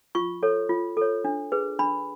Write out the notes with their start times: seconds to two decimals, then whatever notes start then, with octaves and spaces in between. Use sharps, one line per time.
0.15 F4 C#6
0.43 A4 C#5
0.69 F4
0.97 A4 C#5
1.25 D4
1.52 G#4 B4
1.79 D4 B5